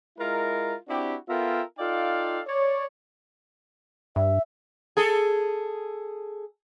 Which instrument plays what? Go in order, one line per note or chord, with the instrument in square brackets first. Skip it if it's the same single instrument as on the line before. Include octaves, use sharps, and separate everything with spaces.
[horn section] G#3 E4 F4 A#4
C4 D4 E4 F#4 G4
B3 F4 A4 A#4 E5 G5
D#4 F4 A4 D5 F5 G5
C#5 D5
[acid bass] G2 [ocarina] E5
[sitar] G#4 A4